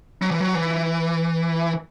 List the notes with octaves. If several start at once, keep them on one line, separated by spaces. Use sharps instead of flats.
F#3
E3
F#3
E3